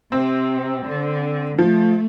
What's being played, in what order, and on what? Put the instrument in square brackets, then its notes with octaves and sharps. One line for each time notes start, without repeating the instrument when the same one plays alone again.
[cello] C3 [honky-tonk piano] C4
[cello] D3
[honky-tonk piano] F3 [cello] A3